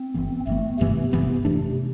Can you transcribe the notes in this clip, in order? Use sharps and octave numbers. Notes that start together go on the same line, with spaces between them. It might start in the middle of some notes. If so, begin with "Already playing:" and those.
Already playing: C4
G1 G2 E3 B3
G1 G2 E3 A3 B3
G1 G2 C3 E3 B3
G1 G2 C3 E3 B3
F2 E3 A3 D4